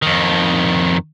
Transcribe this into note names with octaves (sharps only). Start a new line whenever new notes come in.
F2 D#3